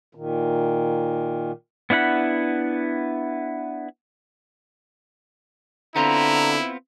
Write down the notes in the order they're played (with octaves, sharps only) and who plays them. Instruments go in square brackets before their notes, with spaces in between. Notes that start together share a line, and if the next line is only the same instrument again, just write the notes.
[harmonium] A#2 D#3
[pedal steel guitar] B3 D4 E4 F#5 B5
[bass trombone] D3 [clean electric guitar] B3 C4 F4 [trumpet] E4 [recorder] A#5